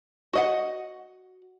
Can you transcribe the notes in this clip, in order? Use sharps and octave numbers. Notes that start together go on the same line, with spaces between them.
F#4 D#5 F#5